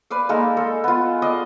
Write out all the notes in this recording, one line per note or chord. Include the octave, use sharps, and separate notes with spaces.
B4 D5 F5
G#3 A#3 D#4 A4
G#3 A4
B3 F4
D5 D#5 F5